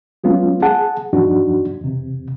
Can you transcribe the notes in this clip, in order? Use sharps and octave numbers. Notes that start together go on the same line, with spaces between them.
F#3 G#3 B3 C#4 F4
G#4 F#5 A5
E2 G2 F3 D4 D#4 F#4
E2 C3